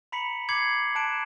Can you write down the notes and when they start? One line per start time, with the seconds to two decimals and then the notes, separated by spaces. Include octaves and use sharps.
0.12 A#5 B5 B6 C#7 F#7
0.49 B5 D6 G#6 C7 C#7 F#7
0.95 A5 F#6 D7 E7